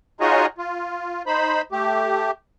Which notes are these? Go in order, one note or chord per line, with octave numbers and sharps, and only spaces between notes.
D#4 F4 F#4 G#4 C#5 D#5
F4
D#4 C5 B5
A3 G4